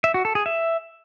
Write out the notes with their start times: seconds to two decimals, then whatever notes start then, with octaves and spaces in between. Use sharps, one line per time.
0.04 E5
0.14 F#4
0.25 A4
0.35 G#4
0.46 E5